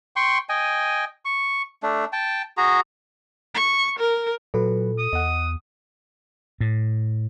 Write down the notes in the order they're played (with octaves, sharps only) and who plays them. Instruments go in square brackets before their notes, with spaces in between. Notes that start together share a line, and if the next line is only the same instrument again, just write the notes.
[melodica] G5 C6 C#6
D#5 G5 G#5
C#6
A3 D4
G5 A5
F#4 G#4 A#5
[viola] C#6
A#4
[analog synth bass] A#2 [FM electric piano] F#3 B4 [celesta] A4
[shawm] D#6
[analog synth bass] E2 [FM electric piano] D#5 F#5
[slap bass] A2